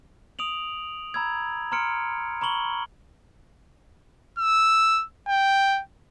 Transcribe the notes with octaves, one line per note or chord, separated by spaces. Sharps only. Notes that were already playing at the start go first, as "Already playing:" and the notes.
D#6 D7 F7 F#7
A#5 B5 E6 G#6
A#5 C6 F6 C#7 D7
A#5 B5 C#6 F#7 G7
E6
G5